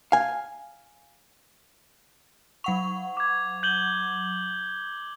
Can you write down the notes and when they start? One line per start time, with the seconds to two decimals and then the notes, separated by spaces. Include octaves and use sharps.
0.12 F5 G#5
2.64 F#3 F#5 C#6 F7
3.17 D6 G#6
3.63 G6 F#7 G7